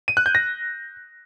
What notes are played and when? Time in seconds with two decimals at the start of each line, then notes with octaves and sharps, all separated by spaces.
0.08 D#7
0.17 F#6
0.26 G6
0.35 A#6